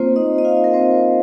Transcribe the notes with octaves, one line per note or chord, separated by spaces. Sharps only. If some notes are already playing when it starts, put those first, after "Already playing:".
Already playing: A#3 C4 F4 C5
D#4 D#5
D#5
F4 F5
A#4
C4 C5